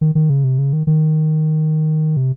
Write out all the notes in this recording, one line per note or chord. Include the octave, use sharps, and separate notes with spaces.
D#3
D#3
C#3
C3
C#3
D#3
D#3
C3